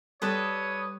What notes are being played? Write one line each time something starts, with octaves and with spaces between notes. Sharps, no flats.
G3 A4 B4 C#5 D5 D#6